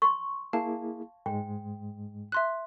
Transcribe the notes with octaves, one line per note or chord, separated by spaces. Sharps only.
C6 C#6
A#3 E4 G#4 F5 A5
G#2 G#3 G5
E5 C6 F#6